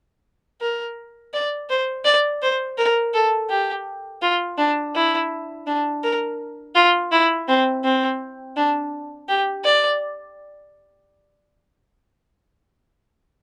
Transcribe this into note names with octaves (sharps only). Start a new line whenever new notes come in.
A#4
D5
C5
D5
C5
A#4
A4
G4
F4
D4
E4
D4
A#4
F4
E4
C4
C4
D4
G4
D5